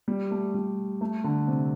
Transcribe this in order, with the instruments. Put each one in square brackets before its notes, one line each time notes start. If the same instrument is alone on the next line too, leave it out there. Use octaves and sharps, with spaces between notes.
[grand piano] G3
A3
G3
A3
D3
C3